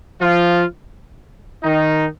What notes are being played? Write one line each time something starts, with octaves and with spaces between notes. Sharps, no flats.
F3 F4
D#3 D#4